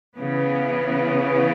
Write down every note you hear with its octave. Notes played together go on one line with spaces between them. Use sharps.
C#3 E3 B3